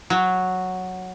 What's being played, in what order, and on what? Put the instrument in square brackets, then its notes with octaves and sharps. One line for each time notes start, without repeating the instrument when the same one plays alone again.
[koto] F#3